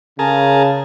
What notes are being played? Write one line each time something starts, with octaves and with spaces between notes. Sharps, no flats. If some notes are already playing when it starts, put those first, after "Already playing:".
C#3 G#4 A#4 A5